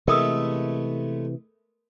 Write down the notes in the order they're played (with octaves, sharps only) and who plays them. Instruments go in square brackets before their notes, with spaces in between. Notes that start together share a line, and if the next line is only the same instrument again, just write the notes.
[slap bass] C3 E3 [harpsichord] G#3 A3 B3 [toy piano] A#4 D#6 E6